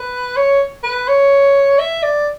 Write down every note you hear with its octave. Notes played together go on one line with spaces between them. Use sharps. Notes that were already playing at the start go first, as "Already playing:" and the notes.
Already playing: B4
C#5
B4
C#5
E5
D5